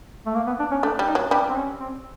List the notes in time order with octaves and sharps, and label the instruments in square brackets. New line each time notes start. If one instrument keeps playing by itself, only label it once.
[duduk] A3
A#3
B3
D4
C#4
[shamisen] A3 [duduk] D4
[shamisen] G3
[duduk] D#4
[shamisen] F#3
[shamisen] G3 [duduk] D4
[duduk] C4
C#4
C4